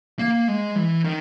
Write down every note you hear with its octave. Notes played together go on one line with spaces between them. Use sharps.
A#3
G#3
E3
D#3